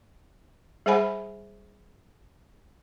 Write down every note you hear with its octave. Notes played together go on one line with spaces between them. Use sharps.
G3 G#4 C5 F#5 G#5 B5